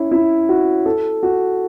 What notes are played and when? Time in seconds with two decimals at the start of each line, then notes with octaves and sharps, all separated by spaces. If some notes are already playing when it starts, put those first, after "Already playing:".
Already playing: C#4 E4
0.11 E4
0.49 F#4
0.86 A4
1.23 F#4